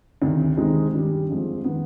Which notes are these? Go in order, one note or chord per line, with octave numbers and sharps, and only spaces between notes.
D2 C3 D#3
C3 D#3 G#3 C4 D#4
G2 D#3 G3
F2 D3 F3 G#3
D#3 B3